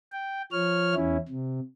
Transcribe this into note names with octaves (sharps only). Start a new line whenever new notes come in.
G5
F3 C#5 F6
E2 C#4 E4
C3